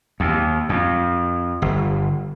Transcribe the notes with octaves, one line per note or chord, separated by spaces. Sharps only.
D#2
F2
G1